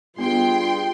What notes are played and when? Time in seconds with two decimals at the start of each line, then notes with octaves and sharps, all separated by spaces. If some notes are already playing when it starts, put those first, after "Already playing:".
0.18 G2 B3 F4 G#4 G5 C6